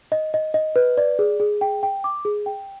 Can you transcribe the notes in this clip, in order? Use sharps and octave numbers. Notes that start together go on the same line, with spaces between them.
D#5
D#5
D#5
B4
D5
G#4
G#4
G5
G5
D6
G#4
G5